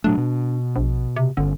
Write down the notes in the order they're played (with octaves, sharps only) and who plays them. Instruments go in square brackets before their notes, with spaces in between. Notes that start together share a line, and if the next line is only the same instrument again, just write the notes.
[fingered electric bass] A#2 F#3 A3 [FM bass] D4
[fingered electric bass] B2
[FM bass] A#1
C3
[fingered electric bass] G1 C#4 [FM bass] D3